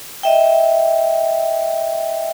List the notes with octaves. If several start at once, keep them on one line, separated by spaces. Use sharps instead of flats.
D#5 E5 G5